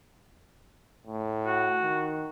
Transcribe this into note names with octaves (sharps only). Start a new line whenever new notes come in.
A2
F#4
D#3